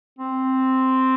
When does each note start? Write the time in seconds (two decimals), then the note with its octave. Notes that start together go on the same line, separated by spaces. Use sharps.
0.19 C4